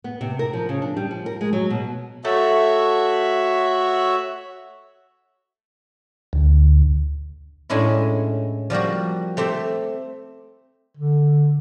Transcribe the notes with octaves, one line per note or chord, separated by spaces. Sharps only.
B3
C3
A#4
F3
C#3
D4
G3
F3
A#4
G#3
F#3
B2
A3 F#4 C#5 E5
D2
A2 G#3 C#4 D4 E4
F3 G3 A#3 F#4
A3 C4 G4 E5
D3